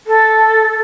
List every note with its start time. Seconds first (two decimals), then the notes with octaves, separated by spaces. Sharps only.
0.07 A4